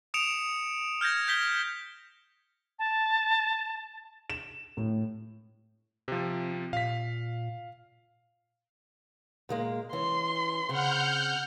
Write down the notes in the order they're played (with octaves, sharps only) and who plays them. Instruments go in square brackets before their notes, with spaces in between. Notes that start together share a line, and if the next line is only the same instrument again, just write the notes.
[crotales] D#6 C#7 D7 E7 F7
F6 G6 G#6 A#6
G6 B6 G7
[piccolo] A5
[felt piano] E7
A2
[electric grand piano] C3 F3 [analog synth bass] C4
[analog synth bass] A#2 [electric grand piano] F5 B6
[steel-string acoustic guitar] A#2 G#3 A#3
[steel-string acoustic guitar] E3 C#4 [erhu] C6
[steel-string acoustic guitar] C#3 C4 [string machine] F#5 F6 G6